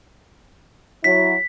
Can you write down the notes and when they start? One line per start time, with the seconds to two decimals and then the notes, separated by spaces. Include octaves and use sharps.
1.04 F#3 E4 B6